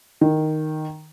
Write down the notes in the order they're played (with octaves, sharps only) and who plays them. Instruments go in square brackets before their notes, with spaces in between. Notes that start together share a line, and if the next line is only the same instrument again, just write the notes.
[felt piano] D#3